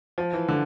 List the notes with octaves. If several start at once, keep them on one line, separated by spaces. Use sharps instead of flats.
F3
E3
D3